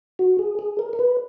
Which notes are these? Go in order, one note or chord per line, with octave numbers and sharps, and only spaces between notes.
F#4
G#4
G#4
A#4
A#4
B4